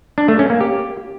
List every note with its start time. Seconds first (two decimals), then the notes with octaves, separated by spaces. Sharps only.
0.18 D4
0.28 A3
0.39 C#4
0.50 A#3
0.61 G4